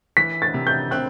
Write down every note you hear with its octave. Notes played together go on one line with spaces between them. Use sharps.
E3 B6
A6
C3
G6
C4 F#6